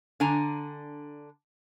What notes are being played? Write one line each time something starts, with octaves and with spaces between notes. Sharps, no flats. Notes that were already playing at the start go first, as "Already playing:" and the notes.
D3 D4 G#5 A#5